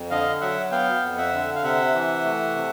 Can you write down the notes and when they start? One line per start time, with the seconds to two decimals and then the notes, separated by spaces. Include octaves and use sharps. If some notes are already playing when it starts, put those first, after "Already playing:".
Already playing: F2
0.10 D3 D#5 F5
0.41 F#3 E5 F#5
0.71 B3 F5 G5
1.02 F2
1.17 E5 F#5
1.34 D3
1.56 F5
1.63 C3 E5 F#5
1.94 E3
2.25 A3
2.56 C3